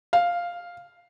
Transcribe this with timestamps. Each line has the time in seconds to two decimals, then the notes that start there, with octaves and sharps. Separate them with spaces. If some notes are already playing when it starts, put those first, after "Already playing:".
0.13 F5